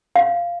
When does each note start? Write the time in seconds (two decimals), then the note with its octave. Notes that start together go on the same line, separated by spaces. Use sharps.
0.16 F5